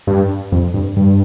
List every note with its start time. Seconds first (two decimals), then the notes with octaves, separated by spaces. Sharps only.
0.07 G2
0.52 F2
0.74 G2
0.97 G2